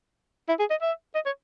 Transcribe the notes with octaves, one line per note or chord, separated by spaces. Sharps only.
E4
G#4
D#5
E5
D#5
C#5